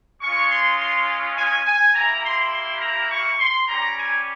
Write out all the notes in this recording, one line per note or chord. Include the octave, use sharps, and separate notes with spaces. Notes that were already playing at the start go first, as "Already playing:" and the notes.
G#3 C#4 F4 C#6
C6
C6
G#5
G#5
A#3 E4 G4 A#5
C6
C6
A#5
C#6
C6
G3 C#4 G4 A#5
G#5